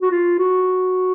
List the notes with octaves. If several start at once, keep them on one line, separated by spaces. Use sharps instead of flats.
F#4
F4
F#4